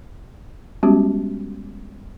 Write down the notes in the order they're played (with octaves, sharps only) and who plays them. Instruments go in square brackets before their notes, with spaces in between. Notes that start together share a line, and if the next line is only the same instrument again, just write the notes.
[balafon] G3 G#3 B3 C#4 F#4 G4